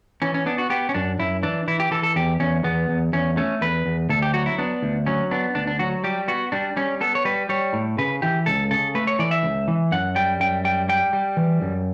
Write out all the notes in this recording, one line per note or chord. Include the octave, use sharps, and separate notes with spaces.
E3 C#4
C#4
B3 D4
F#4
B3 G4
C#4
F#2 D4
F#2 E4
E3 D4
E3 E4
G4
E3 A4
A4
E2 G4
E2 C#4
E2 B3
E2
E2 C#4
A3 C#4
E2 B4
E2
D2 A4
G4
F#3 F#4
E4
B3 D4
D2
F#3 C#4
B3 D4
D2 D4
D4
F#3 F#4
G3 G4
B3 F#4
G3 D4
G3 C#4
B3 A4
C#5
G3 B4
G3 C#5
A2
C#3 B4
E3 G4
C#2 A4
C#3 A4
A3 B4
C#5
E3 D5
E5
C#2
E3
F#2 F#5
G3 G5
F#2 G5
G3 G5
G3 G5
G3
E3
F#2